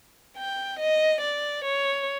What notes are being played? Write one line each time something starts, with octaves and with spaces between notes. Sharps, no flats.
G5
D#5
D5
C#5